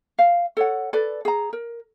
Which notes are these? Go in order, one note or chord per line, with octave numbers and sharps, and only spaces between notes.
F5
A4 C#5 F#5
A4 B4 D5
G#4 A#5
A#4